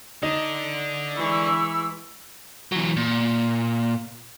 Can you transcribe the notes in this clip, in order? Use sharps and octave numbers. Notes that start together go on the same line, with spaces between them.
D3 D4 D#4
E3 G#3 C#6 E6
E3 F#3
A#2